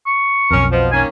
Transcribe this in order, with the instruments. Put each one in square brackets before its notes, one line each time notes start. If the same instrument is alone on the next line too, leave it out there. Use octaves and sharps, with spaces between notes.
[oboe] C#6
[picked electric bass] B1 F2 [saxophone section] C#4 A#4
[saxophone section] B2 F3
[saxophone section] D#3 A#3 C#4 [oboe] G#5